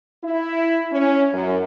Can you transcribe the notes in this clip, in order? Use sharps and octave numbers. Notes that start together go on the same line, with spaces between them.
E4
C#4
F#2